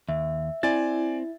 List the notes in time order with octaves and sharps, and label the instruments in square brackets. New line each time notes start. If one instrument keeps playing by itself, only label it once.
[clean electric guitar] D#2 [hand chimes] E5
[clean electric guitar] C4 [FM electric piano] E4 [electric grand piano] D5 G#5 A6